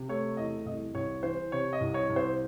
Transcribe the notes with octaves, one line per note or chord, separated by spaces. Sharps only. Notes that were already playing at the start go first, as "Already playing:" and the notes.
Already playing: C3
A3 C#5
E2 D#5
C2 D#5
C2 C#5
E3 C5
C3 C#5
D#5
C2
C#5
C2
C5